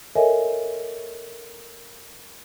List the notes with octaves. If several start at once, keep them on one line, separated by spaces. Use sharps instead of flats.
A4 A#4 C#5 D#5 E5 G#5